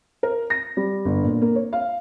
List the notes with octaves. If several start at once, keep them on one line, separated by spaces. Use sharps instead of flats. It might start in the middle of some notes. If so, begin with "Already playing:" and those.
A#4
A#6
G3
G1
A#2
A#3
C#5
F5